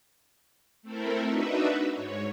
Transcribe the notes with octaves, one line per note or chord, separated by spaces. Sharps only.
A3 C4 E4 A4 A#4
D4 D#4 F#4 B4 E5
G#2 C#5